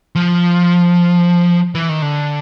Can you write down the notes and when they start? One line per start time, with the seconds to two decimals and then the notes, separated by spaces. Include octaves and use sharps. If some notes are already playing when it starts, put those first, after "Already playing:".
0.15 F3
1.75 E3
1.89 D#3
2.02 D3